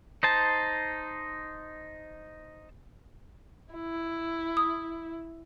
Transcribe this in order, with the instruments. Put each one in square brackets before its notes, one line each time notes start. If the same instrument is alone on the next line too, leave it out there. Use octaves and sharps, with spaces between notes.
[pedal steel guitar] D#4 C5 A5
[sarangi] E4
[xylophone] D#6